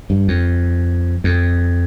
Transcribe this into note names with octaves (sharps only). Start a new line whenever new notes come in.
G2
F2
F2